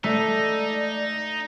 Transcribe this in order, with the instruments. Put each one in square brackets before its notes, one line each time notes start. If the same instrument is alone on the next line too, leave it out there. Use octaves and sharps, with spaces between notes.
[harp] A3 [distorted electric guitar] D#4 [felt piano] A4 E5 B6 [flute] D5